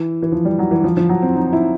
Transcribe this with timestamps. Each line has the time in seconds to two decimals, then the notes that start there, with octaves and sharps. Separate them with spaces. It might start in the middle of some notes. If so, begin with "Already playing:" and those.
Already playing: E3
0.22 E3
0.32 F3
0.45 G3
0.59 F#3
0.71 E3
0.84 F3
0.97 F3
1.09 F#3
1.22 C4
1.35 D#4
1.53 E4